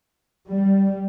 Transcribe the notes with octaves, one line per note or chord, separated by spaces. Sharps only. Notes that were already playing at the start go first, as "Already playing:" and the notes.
G3